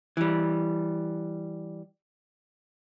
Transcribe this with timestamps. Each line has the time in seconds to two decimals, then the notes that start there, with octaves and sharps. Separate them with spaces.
0.17 E3 G3